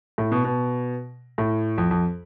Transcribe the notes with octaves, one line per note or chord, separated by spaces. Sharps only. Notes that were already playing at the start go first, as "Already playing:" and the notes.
A2
B2
B2
A2
F2
F2